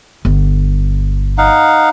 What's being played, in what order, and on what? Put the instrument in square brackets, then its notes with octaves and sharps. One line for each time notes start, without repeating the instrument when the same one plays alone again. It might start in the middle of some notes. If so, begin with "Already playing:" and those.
[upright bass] G1
[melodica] D#4 F5 F#5